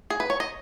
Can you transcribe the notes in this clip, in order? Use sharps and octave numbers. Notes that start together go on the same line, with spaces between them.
G#4
B4
C#5
D#5